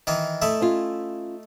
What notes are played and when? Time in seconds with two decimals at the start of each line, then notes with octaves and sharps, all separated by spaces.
0.07 D#3 E3 D#4
0.42 A3 D#4 E4
0.61 C#4 F4